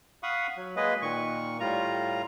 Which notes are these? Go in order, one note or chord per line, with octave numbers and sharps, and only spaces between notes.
F5 F#5 B5 C#6 D#6
F#3
G#3 A#3 G#4 B4 D#5
A#2 D#3 C#6
A2 G3 F4 A#5